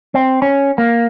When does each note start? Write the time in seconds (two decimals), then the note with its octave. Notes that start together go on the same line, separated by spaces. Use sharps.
0.14 C4
0.42 C#4
0.78 A#3